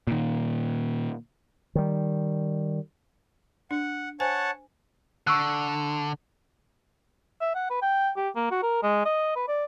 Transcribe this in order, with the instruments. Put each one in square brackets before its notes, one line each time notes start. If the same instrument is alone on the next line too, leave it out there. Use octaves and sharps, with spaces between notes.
[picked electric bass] A#2 D#3
[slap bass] D#3 G3
[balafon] D4 [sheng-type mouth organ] F#5
[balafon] C5 G#5 [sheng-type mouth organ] C#5 F#5 A5
[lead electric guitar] D3 [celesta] C#6 E6 F#6
[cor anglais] E5
F#5
B4
G5
G4
A#3
F#4
A#4
G#3
D#5
B4
D5